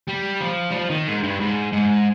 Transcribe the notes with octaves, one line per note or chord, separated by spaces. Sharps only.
G3
F3
G3
F3
D#3
G#2
G2
G#2
G#2